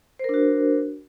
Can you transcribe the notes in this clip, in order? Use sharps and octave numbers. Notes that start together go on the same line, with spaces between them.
D4 F#4 A#4 C5